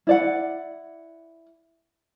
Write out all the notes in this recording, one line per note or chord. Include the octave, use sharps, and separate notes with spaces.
E4 D5 F#5